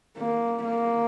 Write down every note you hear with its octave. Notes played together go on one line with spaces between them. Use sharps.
A#3
A#3